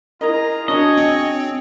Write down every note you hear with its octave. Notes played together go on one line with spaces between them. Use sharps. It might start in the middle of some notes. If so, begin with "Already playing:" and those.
E4 F4 G#4 A#4 D#5 A#5
D4 F#4 G#4 C#5 D#5
C4